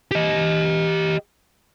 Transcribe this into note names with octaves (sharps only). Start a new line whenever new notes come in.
G4 D#5